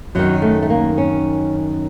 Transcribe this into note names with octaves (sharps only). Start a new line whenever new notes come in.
F#2 D#3 F#3
A3
A3
A#3
C#4